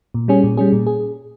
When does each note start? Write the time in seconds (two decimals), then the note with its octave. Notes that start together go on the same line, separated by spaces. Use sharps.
0.14 A#2
0.28 G3 C#4 G#4
0.44 A#2
0.57 G3 C#4 G#4
0.72 A#2
0.86 G#4